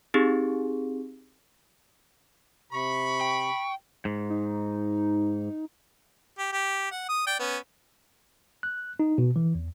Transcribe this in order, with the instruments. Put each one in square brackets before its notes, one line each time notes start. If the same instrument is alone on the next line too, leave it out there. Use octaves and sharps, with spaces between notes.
[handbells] C4 D#4 G4 G#4
[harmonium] C3 [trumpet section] B5 [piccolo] C#6
[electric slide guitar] G5
[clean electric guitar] G#2
[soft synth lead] D#4
[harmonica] G4
G4
F#5
D#6
D5 G5
B3 C#4
[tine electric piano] F#6
D#4
B2
E3
E2